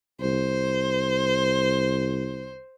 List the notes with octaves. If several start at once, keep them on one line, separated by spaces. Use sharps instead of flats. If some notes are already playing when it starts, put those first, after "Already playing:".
C2 C5